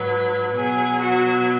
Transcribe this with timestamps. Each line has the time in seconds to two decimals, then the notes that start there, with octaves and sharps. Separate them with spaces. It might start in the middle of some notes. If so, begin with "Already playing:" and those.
Already playing: G#2 F#3 B4
0.56 B2 F#3 G#4
1.00 F#4